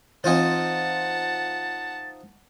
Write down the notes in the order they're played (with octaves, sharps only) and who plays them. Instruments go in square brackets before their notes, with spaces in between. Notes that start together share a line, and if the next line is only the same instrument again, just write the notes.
[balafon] E3 C4 [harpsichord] D#4 F4 C5 [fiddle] F#5 A5 [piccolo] A6